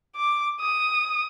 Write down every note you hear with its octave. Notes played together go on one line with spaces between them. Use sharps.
D6
D#6